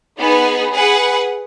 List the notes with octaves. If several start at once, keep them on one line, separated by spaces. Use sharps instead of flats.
B3 D#4 G#4 B4
G#4 B4 F#5